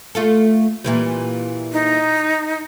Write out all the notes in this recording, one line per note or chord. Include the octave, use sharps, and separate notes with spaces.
A3 F4 A4
A#2 E3 G3
D#4